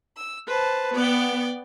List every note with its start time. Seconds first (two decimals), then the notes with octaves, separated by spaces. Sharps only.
0.17 E6
0.47 B4 C5 A5
0.95 B3 D5 G5